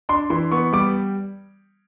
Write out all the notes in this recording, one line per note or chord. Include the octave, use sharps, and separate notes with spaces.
D4 C6
E3 C6
B3 C#6
G3 D6